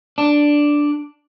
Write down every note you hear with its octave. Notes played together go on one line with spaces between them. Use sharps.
D4